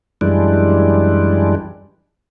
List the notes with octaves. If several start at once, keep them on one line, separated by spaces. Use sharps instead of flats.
F#2 E3 G3 G#3 D4